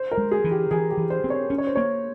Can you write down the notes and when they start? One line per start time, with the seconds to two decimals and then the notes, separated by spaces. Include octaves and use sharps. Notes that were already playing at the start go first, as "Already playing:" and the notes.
Already playing: C5
0.12 A#4
0.18 G#3
0.31 G#4
0.44 E3
0.51 G4
0.71 E3 G#4
0.90 G4
0.97 E3
1.10 C5
1.24 C4
1.30 C#5
1.50 C#4
1.58 C#5
1.67 C5
1.76 A#3 C#5